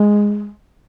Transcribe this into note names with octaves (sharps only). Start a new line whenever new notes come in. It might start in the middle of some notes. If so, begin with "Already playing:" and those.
Already playing: G#3